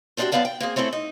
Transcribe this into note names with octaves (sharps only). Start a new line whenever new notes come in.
A3 C4 D4 D#4 F#4 G4
F#2 F3 B3 D5 F5 A5
G5
A#3 C4 G#4
A3 C4 C#4 E4 A4
D#4